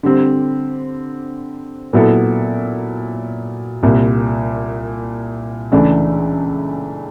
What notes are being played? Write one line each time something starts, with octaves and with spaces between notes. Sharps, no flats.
D3 G3 C4
A#2 F#3 B3 E4 A4
C2 A#2 G3
C#2 C#3 E3 A3 D4